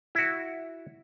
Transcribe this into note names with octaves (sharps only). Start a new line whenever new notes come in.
E4 F#4